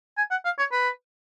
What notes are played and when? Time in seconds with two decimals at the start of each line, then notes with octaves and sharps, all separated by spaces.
0.18 G#5
0.31 F#5
0.45 F5
0.59 C#5
0.72 B4